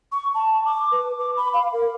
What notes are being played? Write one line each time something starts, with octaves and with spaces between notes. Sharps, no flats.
C#6
A5
D6
B4
D6
B5
F5
A#4